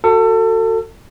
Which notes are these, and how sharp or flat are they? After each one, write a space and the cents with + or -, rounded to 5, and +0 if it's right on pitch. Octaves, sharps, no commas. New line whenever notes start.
F#4 +0 A4 +30